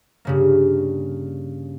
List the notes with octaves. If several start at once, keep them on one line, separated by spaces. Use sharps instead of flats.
G2 C#3 A#3